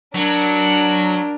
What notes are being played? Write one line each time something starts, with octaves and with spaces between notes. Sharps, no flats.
F#3 D4 A#4